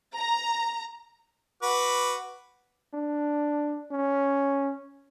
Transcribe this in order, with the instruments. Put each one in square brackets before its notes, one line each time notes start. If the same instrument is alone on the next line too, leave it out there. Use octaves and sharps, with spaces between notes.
[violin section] A#5
[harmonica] F#4 B4 D6
[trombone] D4
C#4